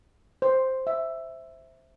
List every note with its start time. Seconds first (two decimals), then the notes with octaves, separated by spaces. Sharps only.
0.42 C5
0.87 E5